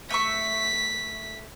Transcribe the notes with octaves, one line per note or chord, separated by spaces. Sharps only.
A3 E5 C#6 B6